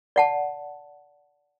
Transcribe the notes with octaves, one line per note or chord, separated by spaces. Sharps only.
D5 F#5 A5